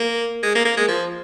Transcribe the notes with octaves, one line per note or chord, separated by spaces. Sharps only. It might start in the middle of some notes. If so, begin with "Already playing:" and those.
Already playing: A#3
G#3
A#3
A#3
G#3
F3